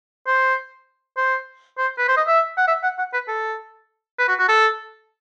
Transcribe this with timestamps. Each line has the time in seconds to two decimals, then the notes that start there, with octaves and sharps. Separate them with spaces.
0.27 C5
1.17 C5
1.78 C5
1.98 B4
2.08 C5
2.17 D#5
2.28 E5
2.58 F#5
2.68 E5
2.84 F#5
2.99 F#5
3.14 B4
3.28 A4
4.19 B4
4.29 F#4
4.39 F#4
4.49 A4